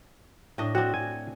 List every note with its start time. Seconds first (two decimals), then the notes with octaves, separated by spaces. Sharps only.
0.58 A2 D4 D#5
0.75 C4 D4 F#4
0.94 G#5